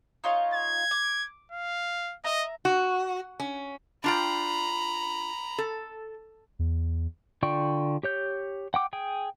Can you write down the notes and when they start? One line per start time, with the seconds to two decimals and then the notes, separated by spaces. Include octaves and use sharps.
0.24 D#4 F4 C#5
0.54 G#6
0.91 D6
1.51 F5
2.24 D#5 E5 A#5
2.65 F#4
3.40 C#4
4.04 D4 F4 G5 A#5 B5
5.58 A4
6.59 E2
7.43 D3 F4 D5 G5 C#6
8.03 G4 C#5 G6
8.74 F#5 G5 D6
8.93 G#4 G5